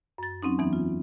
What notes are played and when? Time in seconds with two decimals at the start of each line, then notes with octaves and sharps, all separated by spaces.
0.18 F#2 A6
0.42 F#3 C4 C#4 D#4
0.59 E2 E3 F#3 B3 D#4
0.73 F4